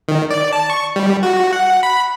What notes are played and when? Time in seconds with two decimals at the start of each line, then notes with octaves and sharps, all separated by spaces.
0.08 D#3
0.31 D5
0.53 A5
0.70 C#6
0.96 G3
1.23 F#4
1.53 F#5
1.83 B5